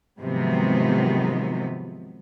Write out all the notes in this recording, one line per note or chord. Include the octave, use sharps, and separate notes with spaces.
G#2 C3 D#3 F3 F#3 B3